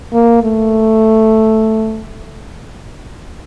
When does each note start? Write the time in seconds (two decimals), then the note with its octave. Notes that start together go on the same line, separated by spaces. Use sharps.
0.13 A#3
0.43 A3